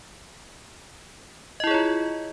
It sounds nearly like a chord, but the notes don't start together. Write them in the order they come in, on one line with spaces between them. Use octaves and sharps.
D#5 E4 G#4 C#5 F4